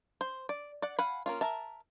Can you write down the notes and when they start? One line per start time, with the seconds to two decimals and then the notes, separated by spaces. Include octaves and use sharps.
0.21 C5
0.49 D5
0.82 D5 F#5
0.99 F5 F#5 G#5 B5
1.26 A#3 C#4 F4
1.41 A#4 E5 A5